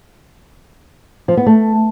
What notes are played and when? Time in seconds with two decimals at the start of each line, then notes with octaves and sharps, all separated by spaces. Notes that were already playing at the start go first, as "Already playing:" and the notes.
1.28 F3
1.37 B3
1.46 A3